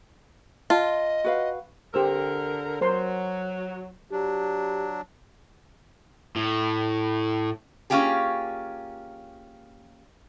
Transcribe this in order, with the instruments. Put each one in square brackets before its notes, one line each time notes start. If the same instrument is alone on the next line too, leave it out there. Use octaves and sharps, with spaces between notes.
[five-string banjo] F4 [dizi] D#5 [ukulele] A5
[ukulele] F#4 B4 F5
[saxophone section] D3 A#4 [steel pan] G4 C5 E6
[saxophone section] F#3 [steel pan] A#4 C5 C6
[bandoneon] F#3 D4 [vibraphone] G4
[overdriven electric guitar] A2
[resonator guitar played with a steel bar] A#3 C#4 D#4 F4 G4 G#4